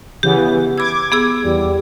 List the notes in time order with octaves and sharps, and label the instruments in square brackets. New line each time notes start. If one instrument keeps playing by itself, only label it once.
[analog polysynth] C#3 E3 B3 [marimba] G4
[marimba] B5 E6 [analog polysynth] D6 G#6
[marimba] B3 G#4 E6
[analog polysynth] E2 [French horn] G3